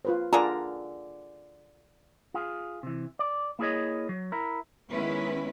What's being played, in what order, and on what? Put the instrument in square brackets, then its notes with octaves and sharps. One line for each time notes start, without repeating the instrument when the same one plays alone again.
[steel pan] F4 B4 C5
[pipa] D3 G#4 A#5 [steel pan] F4 A#4 D5
[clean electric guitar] F4 G#4
C3 E3
D5
A#3 E4 G#4 A4 C#5 D#5
F#3
E4 A#4
[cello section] D#3 G#3 B3 C#4 E4 B4